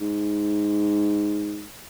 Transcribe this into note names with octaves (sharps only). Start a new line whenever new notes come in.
G#2